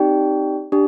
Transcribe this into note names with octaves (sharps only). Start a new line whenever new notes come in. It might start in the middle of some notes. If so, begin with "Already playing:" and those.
Already playing: C4 D#4 G4 D5 G5
D4 G4